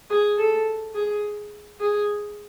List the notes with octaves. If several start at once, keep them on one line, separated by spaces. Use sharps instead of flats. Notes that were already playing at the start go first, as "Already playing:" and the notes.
G#4
A4
G#4
G#4